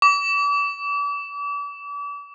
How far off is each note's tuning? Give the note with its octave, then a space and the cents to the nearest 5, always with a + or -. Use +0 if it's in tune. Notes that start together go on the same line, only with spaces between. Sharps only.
D6 -40